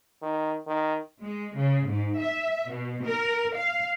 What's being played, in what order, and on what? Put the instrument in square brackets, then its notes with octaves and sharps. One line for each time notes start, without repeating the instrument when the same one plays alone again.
[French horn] D#3
D#3
[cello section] G#3
C#3
G#2
E5
B2
A#4
F5